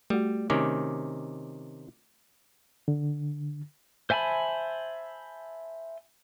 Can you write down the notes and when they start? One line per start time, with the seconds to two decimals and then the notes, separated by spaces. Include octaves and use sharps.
0.10 G3 A3 F#4
0.50 C3 D#3 C#4 D6
2.88 D3
4.10 C5 E5 G#5 A5 B5